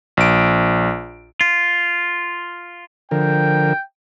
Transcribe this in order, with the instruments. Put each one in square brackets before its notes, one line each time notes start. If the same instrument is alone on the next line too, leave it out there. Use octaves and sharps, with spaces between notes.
[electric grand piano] A#1 D7
[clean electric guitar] F4
[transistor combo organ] D3 F3 A#4 [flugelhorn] G5